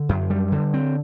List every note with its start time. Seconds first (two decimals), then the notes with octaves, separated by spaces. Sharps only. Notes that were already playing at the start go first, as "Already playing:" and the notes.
Already playing: D3
0.09 F#2
0.30 G3
0.52 D3
0.74 C4